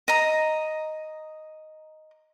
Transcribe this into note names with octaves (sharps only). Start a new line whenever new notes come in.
D#5 A#5